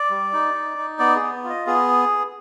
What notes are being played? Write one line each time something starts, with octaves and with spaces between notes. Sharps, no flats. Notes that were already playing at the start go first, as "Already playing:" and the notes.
Already playing: D5
G3
D#4
D#4
D#4
B3 D5
G#4
B3
F4
D#5
B3 G#4